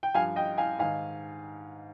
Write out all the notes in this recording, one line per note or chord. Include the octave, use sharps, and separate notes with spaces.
G5
G2 F3 F5 G#5
D#5 G5
F5 G#5
G#2 D#3 F5 G#5